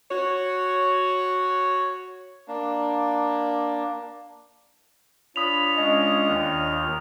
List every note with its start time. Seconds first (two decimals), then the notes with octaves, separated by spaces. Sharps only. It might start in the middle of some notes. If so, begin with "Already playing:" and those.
0.11 F#4 C#5
2.48 A#3 D4
5.36 D4 F4 C#5 B5 D#6 F7
5.77 G#3 C#4 D#5
6.28 D#2 D#3